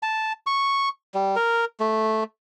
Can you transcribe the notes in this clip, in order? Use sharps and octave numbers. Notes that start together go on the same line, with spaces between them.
A5
C#6
G3
A#4
A3